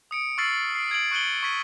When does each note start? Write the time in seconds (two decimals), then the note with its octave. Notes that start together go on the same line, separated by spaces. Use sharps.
0.11 D#6 C#7 D7
0.38 C#6 E6 F6 A6 C7 F#7
0.75 C7 D7
0.91 G#6 D7 F#7
1.11 C#6 F#6 C#7 D#7 F#7 G7
1.43 C#6 G#6 B6 D#7